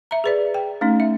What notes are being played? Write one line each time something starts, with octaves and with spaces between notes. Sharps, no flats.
E5 A#5
G#4 B4 D5
G5
A3 C#4 D#4
E5